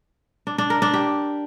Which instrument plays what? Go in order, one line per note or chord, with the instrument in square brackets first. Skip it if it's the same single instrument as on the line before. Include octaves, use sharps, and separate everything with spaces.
[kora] D4
D4
A#4
D4
G4